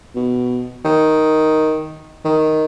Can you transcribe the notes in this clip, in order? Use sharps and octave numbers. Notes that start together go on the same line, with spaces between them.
B2
D#3
D#3